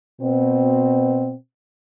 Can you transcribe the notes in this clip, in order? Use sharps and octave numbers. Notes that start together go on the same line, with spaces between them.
B2 C4